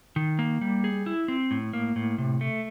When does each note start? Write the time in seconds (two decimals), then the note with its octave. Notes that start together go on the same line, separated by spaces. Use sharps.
0.16 D#3
0.39 A#3
0.61 G3
0.84 G#4
1.06 E4
1.28 C4
1.51 A2
1.73 A#3
1.96 A2
2.18 C3
2.41 A3